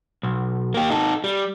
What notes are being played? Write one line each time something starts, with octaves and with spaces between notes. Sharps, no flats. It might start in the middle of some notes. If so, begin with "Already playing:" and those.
B1
A#3 G4
D#4 A4
G3